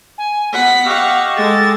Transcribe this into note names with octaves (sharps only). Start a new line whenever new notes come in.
G#5
B3 F#5 B6
G4 D#5 F5 F#5 C#6 E6
G#3 A4 A6